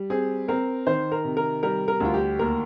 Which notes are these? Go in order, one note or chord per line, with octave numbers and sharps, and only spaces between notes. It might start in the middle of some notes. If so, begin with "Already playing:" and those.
Already playing: G3
C4 G#4
C4 A#4
D#3 C5
A#4
C3
A#4
G3 A#4
A#4
D2 F4
G4
D#2 A#4